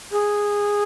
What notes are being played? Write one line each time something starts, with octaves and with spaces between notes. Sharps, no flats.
G#4